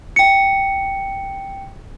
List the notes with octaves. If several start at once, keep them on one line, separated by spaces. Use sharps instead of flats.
G5 C#7